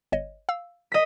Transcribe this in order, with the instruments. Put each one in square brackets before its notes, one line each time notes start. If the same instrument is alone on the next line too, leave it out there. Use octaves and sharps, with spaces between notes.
[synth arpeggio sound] G1 C#5 D#5
F5 E6
[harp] D#5 B6